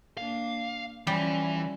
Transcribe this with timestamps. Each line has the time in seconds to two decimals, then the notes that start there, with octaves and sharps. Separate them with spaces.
0.18 A#3 D4 F5
1.07 E3 F3 G3 C#4